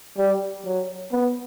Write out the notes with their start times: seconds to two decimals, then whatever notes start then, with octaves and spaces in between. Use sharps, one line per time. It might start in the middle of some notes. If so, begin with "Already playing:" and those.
0.18 G3
0.65 F#3
1.12 B3